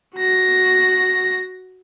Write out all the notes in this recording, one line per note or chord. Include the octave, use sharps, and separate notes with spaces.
F#4 A#6